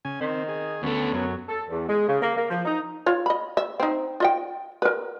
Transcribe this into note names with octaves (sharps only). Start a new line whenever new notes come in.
C#3 G#5
D#3 C4
G#4
D2 A3 B3 C#4
F#2 F#3
A4
E2
G#3
C#3
A#3
A#3
F3
D#4
F4 C#5
D#5 B5
E5
C4 D#4
F4 D#5 G5
A#4 B4